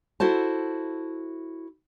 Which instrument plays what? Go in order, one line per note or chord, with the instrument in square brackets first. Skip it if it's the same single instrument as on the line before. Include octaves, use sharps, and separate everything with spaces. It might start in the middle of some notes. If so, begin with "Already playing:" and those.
[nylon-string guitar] E4 F#4 A4 C5 A5